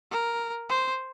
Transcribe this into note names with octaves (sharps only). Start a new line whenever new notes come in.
A#4
C5